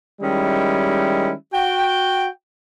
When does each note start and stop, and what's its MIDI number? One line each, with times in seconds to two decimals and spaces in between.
0.21 1.32 51
0.21 1.32 55
0.21 1.32 56
0.21 1.32 61
0.21 1.32 64
1.53 2.28 66
1.53 2.28 79